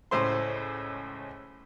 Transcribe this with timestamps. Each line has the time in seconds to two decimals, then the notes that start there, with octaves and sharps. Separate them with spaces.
0.11 C#2 A2 C5 C6